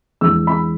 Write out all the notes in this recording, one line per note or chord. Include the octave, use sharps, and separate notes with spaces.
E2 E3 G#3 E6
B5